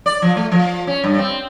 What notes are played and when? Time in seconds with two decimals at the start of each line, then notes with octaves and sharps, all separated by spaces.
0.06 D5
0.22 F3
0.37 A3
0.52 F3
0.87 C#4
1.04 G2
1.19 C4